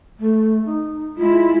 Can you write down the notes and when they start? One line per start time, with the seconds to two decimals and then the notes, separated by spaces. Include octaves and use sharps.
0.19 A3
0.66 D#4
1.17 G#3 E4 F4